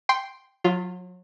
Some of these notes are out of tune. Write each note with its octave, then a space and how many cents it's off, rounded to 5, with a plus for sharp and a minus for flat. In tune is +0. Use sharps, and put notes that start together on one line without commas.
G5 +0 C6 +0
F#3 -35 F4 +0